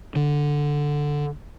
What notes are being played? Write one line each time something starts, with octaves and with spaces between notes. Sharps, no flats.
D3